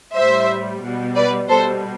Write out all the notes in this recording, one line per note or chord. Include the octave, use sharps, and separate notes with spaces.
A2 G3 C5 E5
B2 G3
B4 D5
B2 G3 A4 C5